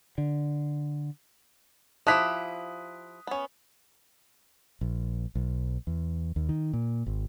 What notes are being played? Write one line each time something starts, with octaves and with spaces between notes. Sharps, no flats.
D3
F3 E4 G4 D#6 F#6 B6
B3 C#4
A#1
B1
E2
D#2
D#3
A#2
G#1